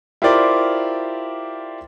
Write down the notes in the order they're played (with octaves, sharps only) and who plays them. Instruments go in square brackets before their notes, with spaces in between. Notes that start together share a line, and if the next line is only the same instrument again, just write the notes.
[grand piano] E4 F4 G4 A#4 C5 D5